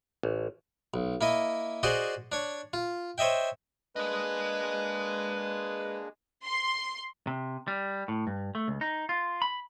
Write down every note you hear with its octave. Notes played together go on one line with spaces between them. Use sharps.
A1
B1
A#3 E4 D#5
F#4 G#4 C5 D5 D#5 C6
D4 C#5
F4
C5 C#5 D#5 E5 G5
G#3 A#3 D4 G#4 B4 D#5
C6
C3
G3
A2
G2
A3
C#2
D#4
F4
B5